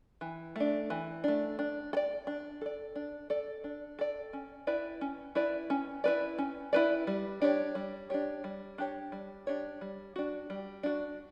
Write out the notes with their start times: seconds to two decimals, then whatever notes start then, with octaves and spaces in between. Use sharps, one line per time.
0.21 E3
0.56 A3 D4
0.90 E3
1.24 A3 D4
1.59 D4
1.93 A4
1.97 D5
2.27 D4
2.61 A4 D5
2.95 D4
3.30 A4 D5
3.64 D4
3.99 A4 D5
4.33 C#4
4.67 E4 B4 D5
5.01 C#4
5.35 E4 B4 D5
5.70 C#4
6.04 E4 B4 D5
6.38 C#4
6.73 E4 B4 D5
7.07 G3
7.42 D4 G4 C#5
7.75 G3
8.10 D4 G4 C#5
8.44 G3
8.78 D4 G4 C#5
9.12 G3
9.47 D4 G4 C#5
9.81 G3
10.16 D4 F#4
10.50 G3
10.83 D4 F#4